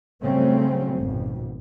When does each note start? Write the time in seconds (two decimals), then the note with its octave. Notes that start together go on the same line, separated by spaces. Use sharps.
0.21 C#3 F#3 G3 A3 C4 C#4
0.98 G#1 F2 B2